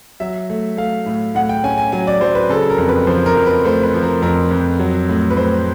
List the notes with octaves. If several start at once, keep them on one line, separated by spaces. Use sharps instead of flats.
F#3 E5
A3
A3 F5
A2
A2 F#5
G5
C#4 G#5
G#5
F#3 G#5
D5
F#3 C5
B4
C#3 A4
A#4
F2
B4
F3 C5
A#4
F2
B4
A3 C5
B4
F3
A#4
F2 A#4
F2
F#3
A2
B4
A2 C5